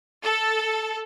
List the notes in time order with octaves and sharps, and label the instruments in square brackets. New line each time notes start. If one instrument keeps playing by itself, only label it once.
[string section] A4